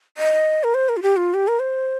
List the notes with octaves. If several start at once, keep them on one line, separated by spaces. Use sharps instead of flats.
D#5
A#4
C5
A#4
F4
G4
F4
G4
A#4
C5